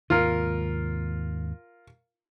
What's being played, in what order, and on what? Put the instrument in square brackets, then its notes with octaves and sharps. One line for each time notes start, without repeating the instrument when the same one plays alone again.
[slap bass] D#2 G#2 C3 [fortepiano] F4 A#4